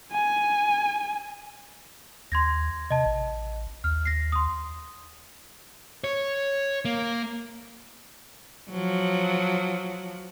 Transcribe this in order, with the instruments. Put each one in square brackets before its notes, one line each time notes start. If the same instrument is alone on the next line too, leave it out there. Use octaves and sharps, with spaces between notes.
[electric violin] G#5
[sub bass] D#2 [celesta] C6 G#6 A#6
[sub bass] C3 [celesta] D#5 A5
[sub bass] A1
[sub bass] D#2 [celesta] F6
[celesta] A#6 C7
C6 D#6
[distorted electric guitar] C#5
A#3
[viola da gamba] F3 F#3